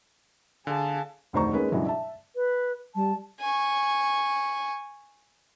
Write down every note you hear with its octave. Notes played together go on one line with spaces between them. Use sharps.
D3 G#4 F5 A5
F1 D2 D#3 C5 A#5 C#6
G#3 A#3 C#4 D#4 A#4 B4
G2 C#3 E3 F#3 G#3
E5 A5
B4
G3 A5
G#5 C#6